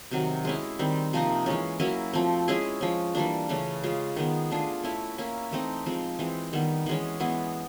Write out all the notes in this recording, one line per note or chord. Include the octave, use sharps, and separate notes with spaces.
C3 D#3 F#3
G#3 C#4 E4
D#3 G3 C4
C3 F3 A#3 D#4
E3 G#3 C#4
F#3 A#3 C#4 E4
F3 A3 C4
G#3 C#4 E4 G#4
F3 G#3 C#4
E3 G3 A#3 D4
C#3 E3 A3 C#4
G#3 C#4 F4
D#3 G#3 B3
A3 D4 F4 G#4
A3 C#4 E4
A#3 C#4 E4
E3 A3 C4 D#4
F3 G#3 C4
E3 G#3 C4
D#3 G3 B3
E3 G#3 C#4
E3 G#3 B3 E4